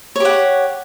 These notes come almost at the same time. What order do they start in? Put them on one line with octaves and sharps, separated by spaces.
C#5 G4 F#5